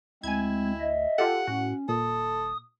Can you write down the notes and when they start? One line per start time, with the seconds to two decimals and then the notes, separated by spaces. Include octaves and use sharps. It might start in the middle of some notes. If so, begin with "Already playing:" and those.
0.23 D2 G#3 C4 E4 G#5 G#6
0.80 D#5 E5
1.18 F4 G4 A4 F#5
1.47 A2 C#4 F#4
1.89 D#1 A#2 A4 D#6